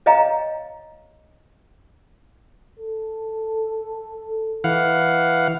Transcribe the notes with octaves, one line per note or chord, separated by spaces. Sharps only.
C#5 D#5 F5 G5 A#5
A4
E3 F5 F#5